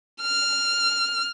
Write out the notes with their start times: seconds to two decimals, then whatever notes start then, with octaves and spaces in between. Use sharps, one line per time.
0.22 F6